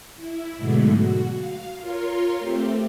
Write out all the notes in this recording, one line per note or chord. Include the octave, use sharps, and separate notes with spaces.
E4
G#2 B2 D3 F#3 G#3 A3
F#4
F5
F4 A#4 C#5 C6
A3 C4 G4